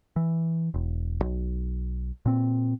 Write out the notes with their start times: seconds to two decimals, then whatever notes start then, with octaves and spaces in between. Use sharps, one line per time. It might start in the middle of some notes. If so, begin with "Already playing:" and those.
0.16 E3
0.74 E1
1.22 B1
2.26 A#2 C4